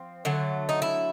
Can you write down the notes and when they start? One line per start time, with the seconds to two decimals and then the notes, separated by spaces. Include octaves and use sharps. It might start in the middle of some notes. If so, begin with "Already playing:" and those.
Already playing: F3 C4
0.25 D3 F#3 A3
0.69 D#4
0.82 E4